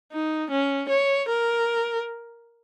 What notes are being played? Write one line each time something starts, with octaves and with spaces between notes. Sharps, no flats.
D#4
C#4
C#5
A#4